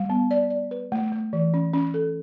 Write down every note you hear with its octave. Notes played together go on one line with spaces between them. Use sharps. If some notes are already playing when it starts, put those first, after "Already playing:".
Already playing: G3
B3
D5
D5
B4
A3
A3
E3
C#4
C#4
A4